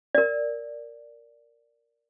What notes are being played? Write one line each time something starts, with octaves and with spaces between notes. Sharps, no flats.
A#4 D5